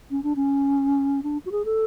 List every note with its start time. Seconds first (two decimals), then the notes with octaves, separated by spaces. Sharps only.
0.11 C#4
0.23 D4
0.36 C#4
1.23 D4
1.46 F#4
1.52 G#4
1.65 A4